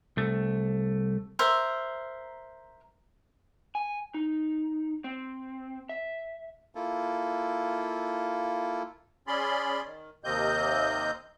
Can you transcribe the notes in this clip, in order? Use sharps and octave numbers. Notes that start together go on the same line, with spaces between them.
C2 A3
A#4 C5 E5
G#5
D#4
C4
E5
A#3 E4 F4 A4
C#4 G#4 D5 B5 C6
D#3
D#2 C3 A#3 C4 D#5 G6